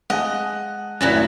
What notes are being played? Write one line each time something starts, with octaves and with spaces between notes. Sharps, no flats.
G#3 D#5 F#5 A5
G#1 F#2 A2 B3 C#4 E4 F#4 D5